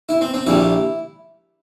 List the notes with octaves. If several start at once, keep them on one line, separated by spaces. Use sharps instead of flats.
E4
C4
C4
A#1 A#2 G3 E4